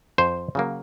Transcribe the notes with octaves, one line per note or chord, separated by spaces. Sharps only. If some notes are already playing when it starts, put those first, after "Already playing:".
F2 C5
C#3 F#3 A#3